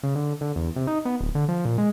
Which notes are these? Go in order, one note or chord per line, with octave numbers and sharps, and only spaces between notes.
C#3
D3
D3
E2
C3
D#4
B3
D1
D3
F3
A#2
G#3